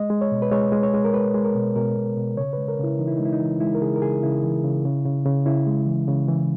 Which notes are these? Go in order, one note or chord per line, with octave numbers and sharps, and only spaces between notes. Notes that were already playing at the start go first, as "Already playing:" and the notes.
Already playing: G#3 D#5
G#3
C#5
B2
B4
G#3 C#5
G#3
C#5
G#3
A#4
G#3 B4
G#3
A#4
B2
B2 A#4
B2
B2
C#3 C#5
G#3 B4
A#4
C#3 E4
E3 D#4
E4
G#3 D#4
E4
D#4
E3
G#3 E4
A#4
C#3 G#4
A#4
C#3 G#4
C#3 E4
E3
C#3
C#3
C#3
C#3
C#3 E4
G#3
E3
C#3
E3